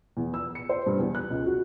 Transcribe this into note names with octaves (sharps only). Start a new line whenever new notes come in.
E2
E6
C#7
C5
G2
E2
F#6
C#2
F#4